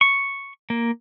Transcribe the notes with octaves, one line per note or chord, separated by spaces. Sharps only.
C#6
A#3